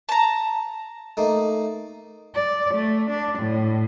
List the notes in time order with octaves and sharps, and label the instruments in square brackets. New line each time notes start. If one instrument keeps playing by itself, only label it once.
[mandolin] A5 A#5
[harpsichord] A3 A#3 D#4
[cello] D5
A3
D4
A2